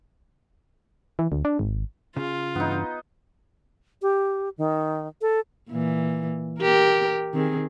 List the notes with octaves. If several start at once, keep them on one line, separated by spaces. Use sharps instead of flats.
E3
D2
D4
G#1
C#3 F4
G2 E3 B3 D4 D#4
G4
D#3
A4
A#2 E3
G4 A#4
D#3 C4 G#4